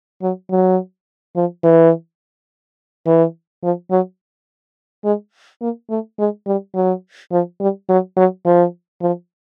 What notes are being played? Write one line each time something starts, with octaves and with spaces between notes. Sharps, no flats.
F#3
F#3
F3
E3
E3
F3
F#3
G#3
A#3
A3
G#3
G3
F#3
F3
G3
F#3
F#3
F3
F3